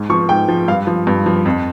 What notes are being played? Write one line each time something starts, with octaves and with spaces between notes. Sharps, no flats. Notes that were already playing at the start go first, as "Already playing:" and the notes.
Already playing: G#2
F3 C#6
G#2 G5
F3
G2 F5
F3
G2
F3
F2